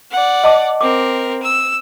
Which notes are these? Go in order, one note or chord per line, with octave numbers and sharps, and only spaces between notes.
D5 F#5
D#5 A5 D6
C4 A#4 D6
E6